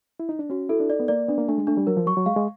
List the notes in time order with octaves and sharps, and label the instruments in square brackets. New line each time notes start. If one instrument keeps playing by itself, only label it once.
[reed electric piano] E4
D#4
D4
[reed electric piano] C#4 [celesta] F#4
[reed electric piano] E4 [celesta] A4
[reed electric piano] D4
[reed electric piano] D#4 [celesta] D5
[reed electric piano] B3
[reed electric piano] A#3 [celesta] D5
[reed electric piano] B3 [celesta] D4
[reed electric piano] A#3
[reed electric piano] A3 [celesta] D4
[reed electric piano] G#3
[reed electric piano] A3 [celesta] D4
[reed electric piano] G3
[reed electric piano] F#3 [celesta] A#4
[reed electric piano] F3
[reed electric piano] F#3 [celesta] C#6
[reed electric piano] F#3
[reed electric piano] G#3 [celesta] F5
[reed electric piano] G#3